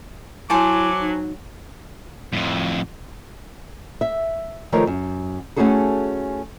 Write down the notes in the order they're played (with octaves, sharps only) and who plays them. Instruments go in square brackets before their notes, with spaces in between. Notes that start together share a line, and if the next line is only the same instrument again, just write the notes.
[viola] F#3 [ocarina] E4 [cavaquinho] C5 G#5 A5 [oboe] D6
[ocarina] D#4
[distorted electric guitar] F2 A2
[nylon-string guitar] E5
D#3 F3 A3 A#4 C#5
F#2
A3 C#4 E4 F#4 G#4 A4